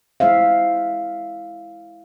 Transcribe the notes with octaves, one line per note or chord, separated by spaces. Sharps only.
G#3 E4 C5 E5 F5